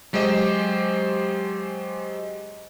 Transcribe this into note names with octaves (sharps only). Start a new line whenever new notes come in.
F#3 G#3 G4 C5 D#5